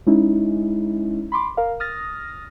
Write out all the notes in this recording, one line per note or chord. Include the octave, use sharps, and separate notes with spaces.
G#3 C#4 D#4 E4
B5 C6 D6
A#4 F5
D#6 F6 A6 A#6